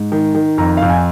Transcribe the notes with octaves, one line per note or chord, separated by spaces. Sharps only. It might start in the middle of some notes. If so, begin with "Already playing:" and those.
Already playing: G#2
D#3
D#3
F2 A#5
F2 F5
G#5